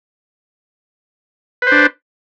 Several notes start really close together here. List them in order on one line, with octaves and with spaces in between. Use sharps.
B4 C5 D4